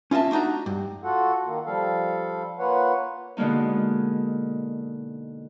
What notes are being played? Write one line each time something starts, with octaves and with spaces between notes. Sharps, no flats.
C#4 F4 D#5 E5 A5
A3 D4 D#4 F#4 A#5
G2
F4 F#4 A4 F#5
D#3 A#3
F3 G3 A4 F5
A#3 F4 B4 C#5 F#5
B2 D3 G#3 A#3 D#4